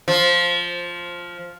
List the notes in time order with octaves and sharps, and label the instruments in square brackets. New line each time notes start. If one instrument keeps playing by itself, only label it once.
[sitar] F3